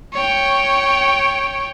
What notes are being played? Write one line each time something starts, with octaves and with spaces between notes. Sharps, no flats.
C#5 G5